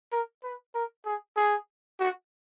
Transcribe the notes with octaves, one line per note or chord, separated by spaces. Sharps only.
A#4
B4
A#4
G#4
G#4
F#4